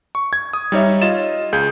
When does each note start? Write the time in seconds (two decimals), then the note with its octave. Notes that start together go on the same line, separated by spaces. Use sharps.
0.15 C#6
0.33 G#6
0.53 D#6
0.72 G3 D#4 C#5 E5
1.02 F4 D#5 A6 E7
1.53 C#2 G#4 G6